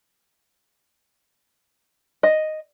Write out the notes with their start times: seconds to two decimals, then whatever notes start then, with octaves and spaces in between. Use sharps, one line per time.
2.23 D#5